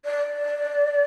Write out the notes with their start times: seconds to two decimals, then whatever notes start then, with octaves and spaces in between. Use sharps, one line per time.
0.04 D5